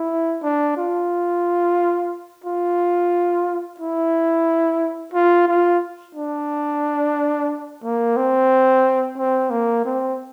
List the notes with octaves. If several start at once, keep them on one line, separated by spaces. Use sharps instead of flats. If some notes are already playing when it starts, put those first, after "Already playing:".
Already playing: E4
D4
F4
F4
E4
F4
F4
D4
A#3
C4
C4
A#3
C4